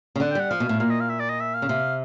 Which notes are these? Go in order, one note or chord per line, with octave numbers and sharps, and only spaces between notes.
C#3
D3 F#5
G5
G3 F#5
F3 F5
B2
A2
A#2 F5
D#5
F5
E5
D5
D#5
E5
F5
C#3
C3